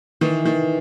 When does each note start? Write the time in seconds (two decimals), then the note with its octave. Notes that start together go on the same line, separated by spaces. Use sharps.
0.21 D#3 E3
0.45 D#3